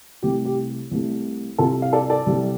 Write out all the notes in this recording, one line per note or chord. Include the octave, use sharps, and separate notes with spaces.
C2 C3 A3 G4
G4
C2 C3 A3
C2 C3 G3 F4 A4
F5
A4 D5
A4 D5
C2 C3 G3